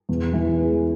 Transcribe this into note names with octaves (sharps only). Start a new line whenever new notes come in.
E2
E3
G#3